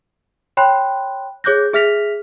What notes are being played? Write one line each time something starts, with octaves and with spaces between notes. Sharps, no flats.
C#5 G5 B5 C6 F#6
G#4 C#5 D6 F#6 G6 A#6
G#4 E5 F6 A#6 B6 F7